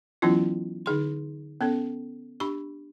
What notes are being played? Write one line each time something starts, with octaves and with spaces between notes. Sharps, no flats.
E3 F#3 B3 C#4 E4 F4
D3 D#4 G#4 C6
B3 C#4 A4
D4 G4 B5 C#6